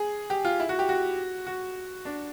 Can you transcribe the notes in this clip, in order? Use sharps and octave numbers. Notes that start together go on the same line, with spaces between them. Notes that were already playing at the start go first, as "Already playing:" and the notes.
Already playing: G#4
G4
F4
E4
F#4
G4
F#4
F#4
D4